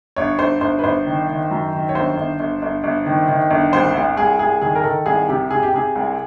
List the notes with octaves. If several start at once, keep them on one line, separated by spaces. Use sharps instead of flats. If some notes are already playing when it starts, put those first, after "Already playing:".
G1 C#5
G1 C5
G1 C5
B4
G1 C5
D#3
D#3
F#2
D#3
C#5
G1 C5
G1
G1
G1
G1
D#3
D#3
G1
C2 C5
C2
C2 G#4
C2 G#4
D#3 G#4
A#4
D#3 A4
C2 G#4
C3 G4
C3 G#4
G4
C3 G#4
C2